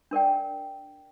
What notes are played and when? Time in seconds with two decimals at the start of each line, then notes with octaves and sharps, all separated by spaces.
0.11 D4 A#4 D5 G5